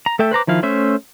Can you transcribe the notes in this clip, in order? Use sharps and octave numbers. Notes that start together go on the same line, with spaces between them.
A#5
A3 A4 E5 G5
B4 C5 A#5 D6
D#3 F3 E4 F5
A3 C#4 C5 E5